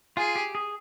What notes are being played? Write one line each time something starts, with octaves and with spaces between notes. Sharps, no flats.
F4 G#4
G4
G#4